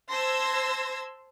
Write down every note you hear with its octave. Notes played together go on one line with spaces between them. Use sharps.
C5 A5 C6 E6 G#6 A#6